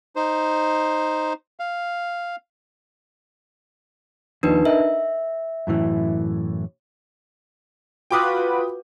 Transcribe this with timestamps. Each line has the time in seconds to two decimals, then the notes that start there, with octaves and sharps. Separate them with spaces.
0.16 D#4 C5
1.60 F5
4.43 D#2 F3 D4 D#4 B4
4.65 A#4 D#5 E5
5.67 F#2 A2 E3
8.11 F4 F#4 B4 G5 D6 D#6